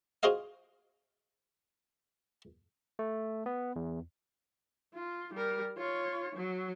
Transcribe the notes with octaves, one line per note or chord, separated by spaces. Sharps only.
F4 F#4 G#4 C5 D#5 F5
A3
B3
E2
F4
G3 A#4
F4 C#5
F#3